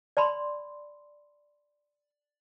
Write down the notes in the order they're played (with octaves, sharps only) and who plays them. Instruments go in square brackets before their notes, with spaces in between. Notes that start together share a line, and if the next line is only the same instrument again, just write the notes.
[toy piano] D5 A5 B5 C6